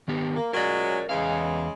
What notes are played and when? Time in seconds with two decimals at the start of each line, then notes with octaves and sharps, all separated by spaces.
0.08 D#3 B3 G4
0.36 A#3
0.53 F#3 G#3 C#4 A#4 D5
1.09 E2 C#3 E3 G#3 F5